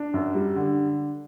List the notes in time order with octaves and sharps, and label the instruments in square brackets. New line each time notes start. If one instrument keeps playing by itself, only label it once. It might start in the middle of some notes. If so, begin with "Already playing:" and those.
Already playing: [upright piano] D4
F#2
G3
D3